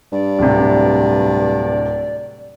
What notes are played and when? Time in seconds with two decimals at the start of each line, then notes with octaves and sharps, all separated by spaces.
0.12 G2 D5
0.39 D1 C3